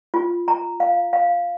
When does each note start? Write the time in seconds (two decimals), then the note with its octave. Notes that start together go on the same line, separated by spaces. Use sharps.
0.14 F4
0.48 A#5
0.80 F5
1.13 F5